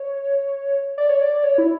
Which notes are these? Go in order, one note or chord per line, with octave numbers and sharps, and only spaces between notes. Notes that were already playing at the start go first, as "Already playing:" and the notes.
Already playing: C#5
D5
C#5
D5
C#5
E4